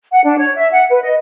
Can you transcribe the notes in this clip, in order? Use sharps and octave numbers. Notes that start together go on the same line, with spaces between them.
F#5
D4
C#5
E5
F#5
B4
D#5